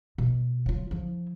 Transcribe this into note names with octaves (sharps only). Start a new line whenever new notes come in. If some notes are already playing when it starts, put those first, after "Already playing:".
B2
F#3 F4
F3 E4